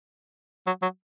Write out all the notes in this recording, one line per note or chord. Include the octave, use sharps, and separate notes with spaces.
F#3
F#3